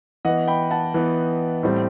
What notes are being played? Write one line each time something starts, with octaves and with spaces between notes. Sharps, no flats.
E3 B3 D#5 F#5
G5 B5
F#5 A5
E3 B3
A2 G3 C4